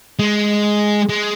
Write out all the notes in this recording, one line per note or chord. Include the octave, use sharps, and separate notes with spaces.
G#3
G#3